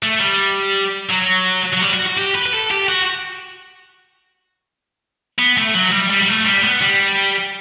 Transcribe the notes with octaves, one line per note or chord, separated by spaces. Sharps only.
A3
G3
F#3
F#3
G3
F#4
F#4
G4
B4
B4
A4
G4
F#4
B3
A3
F#3
G3
G3
G3
A3
G3
B3
G3